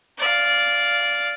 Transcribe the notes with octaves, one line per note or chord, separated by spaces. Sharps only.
D5 F5